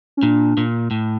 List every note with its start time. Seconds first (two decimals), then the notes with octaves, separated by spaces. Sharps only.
0.17 C#4
0.23 A#2 D4
0.57 A#2
0.91 A2